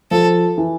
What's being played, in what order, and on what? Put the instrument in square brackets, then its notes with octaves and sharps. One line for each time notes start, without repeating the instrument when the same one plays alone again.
[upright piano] F3 [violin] A4
[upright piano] E3